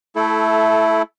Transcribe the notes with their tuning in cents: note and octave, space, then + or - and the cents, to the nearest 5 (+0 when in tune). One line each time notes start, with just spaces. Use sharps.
A3 +0 E4 +5 A4 -20